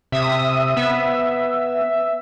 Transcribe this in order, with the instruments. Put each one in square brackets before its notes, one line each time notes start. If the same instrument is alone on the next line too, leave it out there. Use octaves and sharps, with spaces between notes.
[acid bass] C3 [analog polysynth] E5 D#6
[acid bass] B3 [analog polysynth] E5